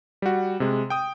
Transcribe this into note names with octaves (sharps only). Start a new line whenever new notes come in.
G3 F#4
C3 G#3
G5 D#6